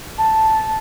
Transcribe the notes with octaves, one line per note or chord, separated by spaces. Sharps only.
A5